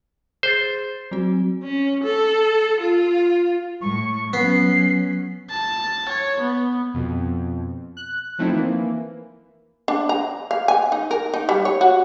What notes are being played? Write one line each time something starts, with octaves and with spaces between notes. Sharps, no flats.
G#4 C5 A6
F#3 C4 F#4
C#4
A4
F4
A2 C#6
F#3 B3 C#4 C7
A5
C#5
B3
F2 B2
F#6
F3 A3 C4 D#4 E4
E3 A#3
D4
A#5
F5
G#5
D#4
A#4
D#4
G3
C#5
F#4